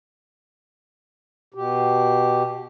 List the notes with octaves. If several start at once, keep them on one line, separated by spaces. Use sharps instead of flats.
B2 G4